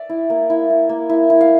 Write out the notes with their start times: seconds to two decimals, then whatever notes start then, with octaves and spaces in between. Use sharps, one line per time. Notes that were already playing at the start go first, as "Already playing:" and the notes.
Already playing: D5 E5
0.09 E4
0.30 A#3
0.50 E4
0.70 E4
0.89 A#3
1.09 E4
1.30 E4
1.41 F5